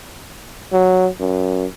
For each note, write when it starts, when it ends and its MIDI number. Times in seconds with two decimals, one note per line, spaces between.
0.72 1.08 54
1.20 1.65 42